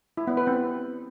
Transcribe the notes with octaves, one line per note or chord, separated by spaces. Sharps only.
E4
B3
B4
C4